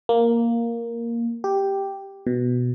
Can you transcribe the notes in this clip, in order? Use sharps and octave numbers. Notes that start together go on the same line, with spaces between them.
A#3
G4
B2